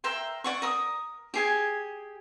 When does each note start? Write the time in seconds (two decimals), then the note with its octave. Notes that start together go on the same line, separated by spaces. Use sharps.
0.04 A#4 E5 G5 C6
0.44 D5 F#5 C#6
0.62 A#4 D#6
1.34 G4 G#4 G#5